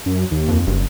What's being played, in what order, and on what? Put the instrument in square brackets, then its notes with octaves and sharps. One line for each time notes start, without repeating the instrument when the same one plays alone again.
[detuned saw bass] F#2
D#2
[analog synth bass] F2
[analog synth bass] F#1 [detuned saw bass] G2